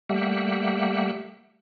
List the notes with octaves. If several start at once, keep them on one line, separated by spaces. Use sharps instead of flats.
G3 A3 A#3 G4 E5 F#5